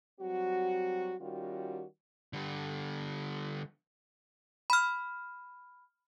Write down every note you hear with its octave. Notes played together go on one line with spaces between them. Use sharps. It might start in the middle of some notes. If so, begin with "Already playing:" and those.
F#3 G3 C4 F#4
D#3 G3 C#4 F4 F#4
D3 G3
B5 F6